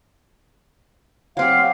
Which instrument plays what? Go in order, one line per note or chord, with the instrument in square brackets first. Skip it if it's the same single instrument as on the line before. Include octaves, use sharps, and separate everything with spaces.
[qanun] F#3 C4 G4 [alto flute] F5